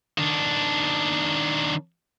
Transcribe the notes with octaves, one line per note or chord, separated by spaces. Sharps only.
D#3 D4